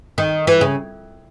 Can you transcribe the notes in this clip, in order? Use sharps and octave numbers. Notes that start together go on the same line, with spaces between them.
D#3
E3
C#3